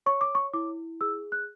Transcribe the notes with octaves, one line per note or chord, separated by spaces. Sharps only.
C#5 C#6
D6
C#6
E4 D6
G#4 E6
F#6